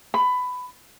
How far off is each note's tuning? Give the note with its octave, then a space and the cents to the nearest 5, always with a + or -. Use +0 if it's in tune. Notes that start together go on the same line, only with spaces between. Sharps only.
B5 +15